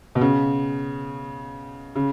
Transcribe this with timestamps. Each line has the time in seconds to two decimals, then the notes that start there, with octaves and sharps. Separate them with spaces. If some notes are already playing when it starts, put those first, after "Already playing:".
0.15 B2
0.21 C#3
1.95 C#3